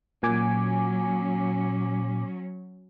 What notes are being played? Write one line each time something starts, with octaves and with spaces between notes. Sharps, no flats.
A#2 F#3 C#4 G#5 D6